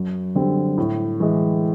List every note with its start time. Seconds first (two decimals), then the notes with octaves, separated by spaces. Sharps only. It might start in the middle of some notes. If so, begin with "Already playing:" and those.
Already playing: F#2
0.36 D3 G3 C4
0.78 A2
1.20 E3 G#3